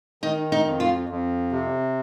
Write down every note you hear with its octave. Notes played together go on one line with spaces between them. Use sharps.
D#3 D#4
D#4
F2
F4
F2
C3